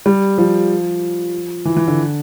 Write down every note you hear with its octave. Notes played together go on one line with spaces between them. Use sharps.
G3
F3
E3
E3
D3